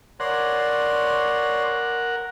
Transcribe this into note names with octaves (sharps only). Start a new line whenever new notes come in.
A#4 C#5 D5 F#5 C6